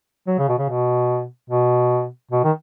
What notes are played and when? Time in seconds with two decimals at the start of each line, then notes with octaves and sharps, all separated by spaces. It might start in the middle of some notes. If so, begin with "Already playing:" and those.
0.27 F#3
0.39 C#3
0.49 B2
0.59 C#3
0.69 B2
1.50 B2
2.31 B2
2.44 D#3